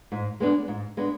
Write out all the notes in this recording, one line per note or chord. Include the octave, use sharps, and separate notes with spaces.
G#2
G#3 B3 D4
G#2
G#3 B3 D4